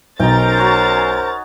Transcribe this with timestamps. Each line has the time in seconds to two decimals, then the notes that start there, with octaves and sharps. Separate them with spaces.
0.20 B1 C#4 D#4 A#4 C5 G5 A#5 A6
0.57 F#4 C#5 G#5